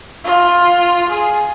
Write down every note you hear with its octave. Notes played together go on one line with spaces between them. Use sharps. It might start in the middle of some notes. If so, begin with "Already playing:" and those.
F4
G#4